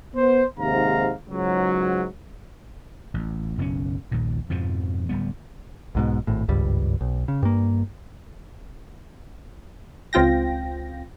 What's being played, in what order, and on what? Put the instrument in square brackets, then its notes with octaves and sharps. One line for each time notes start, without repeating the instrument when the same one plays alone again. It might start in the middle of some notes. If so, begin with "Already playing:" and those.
[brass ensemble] B3 C5
D#2 G#2 C3 F5 A#5
C#2 G#2 F#3
[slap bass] A1
F#1 B1 C4 C#4
A#1 D#2 A#2
F2 G#2 B2 F3
D1 G3 B3
[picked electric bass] B1 G#2 B2
G#1 A2
G#1 C#2 G2 G3
B1
C#3
G2 A#3
[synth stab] C#2 C4 F4 G5 A#6